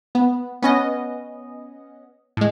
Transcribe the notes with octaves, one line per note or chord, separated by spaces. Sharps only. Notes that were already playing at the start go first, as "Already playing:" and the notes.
B3
B3 C#4 D#5
A2 G#3